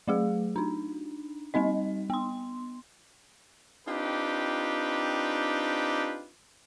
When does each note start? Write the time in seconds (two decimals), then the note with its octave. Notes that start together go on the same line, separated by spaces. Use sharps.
0.08 F#3 A3 G#4
0.56 D4 D#4
1.54 G3 C4 D#4 D#5
2.10 B3 C6
3.87 C4 D4 D#4 F4 G4 B4